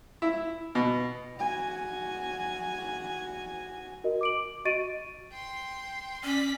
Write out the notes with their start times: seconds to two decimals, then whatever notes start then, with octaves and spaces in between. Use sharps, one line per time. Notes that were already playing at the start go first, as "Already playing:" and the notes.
0.22 E4
0.75 B2
1.37 F#4 G#5
4.04 F#4 A#4 D#5
4.21 D6 D7 F#7
4.65 F#4 D#5 C#6 A6 D7 D#7
5.32 G5 C6
6.24 C#4 D5 B6